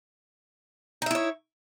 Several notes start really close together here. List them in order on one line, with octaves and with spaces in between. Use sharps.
D#4 E5 E4 C#5